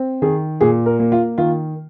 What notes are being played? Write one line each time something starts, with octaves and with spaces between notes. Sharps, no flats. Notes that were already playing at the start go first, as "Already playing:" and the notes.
Already playing: C4
D#3 G#4
A#2 G#4
A#4
A#3
F4
D#3 F4